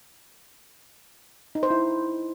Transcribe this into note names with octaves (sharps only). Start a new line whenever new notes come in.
D#4
C5
E4